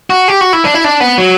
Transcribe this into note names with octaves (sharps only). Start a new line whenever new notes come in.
F#4
G4
F#4
E4
D4
E4
D4
B3
F#3